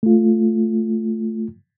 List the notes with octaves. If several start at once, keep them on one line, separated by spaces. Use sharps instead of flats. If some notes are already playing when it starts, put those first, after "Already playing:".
A3 F4